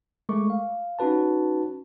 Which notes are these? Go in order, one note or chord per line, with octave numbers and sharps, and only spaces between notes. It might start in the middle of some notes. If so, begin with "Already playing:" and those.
G#3 A3 A#4 C#6 D6
F5
C#4 D#4 F#4 B4 A5